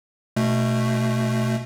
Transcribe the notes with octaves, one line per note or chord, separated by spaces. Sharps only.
B2 A3